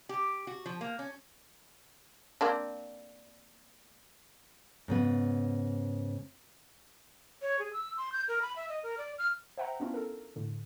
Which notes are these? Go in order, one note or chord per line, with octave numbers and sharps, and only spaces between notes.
G4
F#4
F3
A#3
C#4
A#3 C4 D4
G#2 C#3 B3
C#5
G#4
E6
C6
G6
A#4
B5
E5
D#5
A#4
D5
F6
C5 E5 F#5 G5 A#5
B3 C#4 D4 E4 F4
A4 A#4
A2 D3